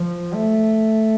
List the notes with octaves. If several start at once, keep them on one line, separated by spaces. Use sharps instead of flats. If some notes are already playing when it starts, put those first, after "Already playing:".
Already playing: F3
A3